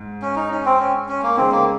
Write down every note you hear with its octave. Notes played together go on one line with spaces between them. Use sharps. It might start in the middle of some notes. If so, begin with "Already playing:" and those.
Already playing: G#2
C#4
D#4
C#4
C4
C#4
C#4
A#3
C#3 G#3 C4 D#4
A#3